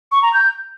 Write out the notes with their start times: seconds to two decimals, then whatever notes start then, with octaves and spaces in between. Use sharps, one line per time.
0.12 C#6
0.23 A#5
0.33 G6